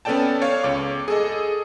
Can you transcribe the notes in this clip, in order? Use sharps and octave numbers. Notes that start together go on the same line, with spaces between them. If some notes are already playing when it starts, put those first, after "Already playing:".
B3 C#4 A4 D5 G5 A5
C#5 F5
C#2 D6
G#4 A4 D#5